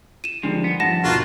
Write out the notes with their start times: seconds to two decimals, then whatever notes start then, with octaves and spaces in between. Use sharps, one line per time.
0.24 D#7 E7
0.43 D3 D#3 F3 G3 G#3
0.64 B3
0.80 G2 F3 F#5 A5 A#6
1.04 D#2 B2 A#3 F4 F#4